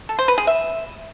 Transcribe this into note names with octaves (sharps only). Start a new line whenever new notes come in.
A4
C5
B4
G#4
E5